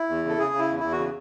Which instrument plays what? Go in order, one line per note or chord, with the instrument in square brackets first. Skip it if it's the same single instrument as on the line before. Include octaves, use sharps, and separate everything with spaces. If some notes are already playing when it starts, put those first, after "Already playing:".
Already playing: [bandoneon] E4
E2
C#3
A4
C#3 G#4
C#3
E4
E2
E2 E4
F#4
C#3